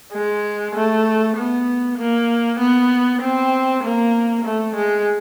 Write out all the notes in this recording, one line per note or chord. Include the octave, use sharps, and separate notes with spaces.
G#3
A3
B3
A#3
B3
C4
A#3
A3
G#3